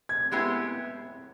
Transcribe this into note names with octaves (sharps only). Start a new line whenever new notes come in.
G#6
G#3 B3 E4 G4